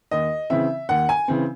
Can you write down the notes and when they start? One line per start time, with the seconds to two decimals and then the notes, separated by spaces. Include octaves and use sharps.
0.11 D#2 D#5
0.50 C#3 E3 C4 E5
0.89 D#2 F#5
1.09 G#5
1.28 C#3 E3 C4